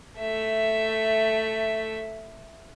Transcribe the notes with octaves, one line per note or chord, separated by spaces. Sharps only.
A3 E5